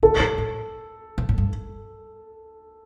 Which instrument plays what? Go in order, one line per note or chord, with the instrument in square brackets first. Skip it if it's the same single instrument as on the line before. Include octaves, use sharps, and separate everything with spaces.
[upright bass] D3 [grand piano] A4
[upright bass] A2
A2
A#2
A2
G2